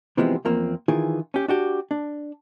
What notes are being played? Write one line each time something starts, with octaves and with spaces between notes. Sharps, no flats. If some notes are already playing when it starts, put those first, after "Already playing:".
C3 E3 F3 G#3 B3 C4
E2 F3 A#3 C4
D#3 E3 F4 G#4
C#4 G4
D4 F#4 G4
D4